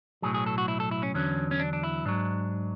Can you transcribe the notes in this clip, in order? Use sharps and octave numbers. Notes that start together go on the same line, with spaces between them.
B1 A2 F#3 G#4
G#4
A4
F#4
E4
A4
E4
C#4
E2 D3 F#3 C#4
C#4
D4
D4
E4
G#2 F#3 D4